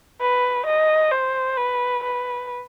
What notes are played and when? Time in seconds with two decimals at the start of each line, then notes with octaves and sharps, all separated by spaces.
0.21 B4
0.66 D#5
1.11 C5
1.57 B4
2.03 B4